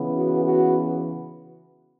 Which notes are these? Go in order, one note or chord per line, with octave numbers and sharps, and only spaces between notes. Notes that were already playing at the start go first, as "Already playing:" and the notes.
Already playing: C#3 E3 B3
F#4
F#4